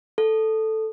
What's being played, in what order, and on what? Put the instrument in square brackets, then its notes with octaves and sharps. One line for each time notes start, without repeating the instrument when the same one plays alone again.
[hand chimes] A4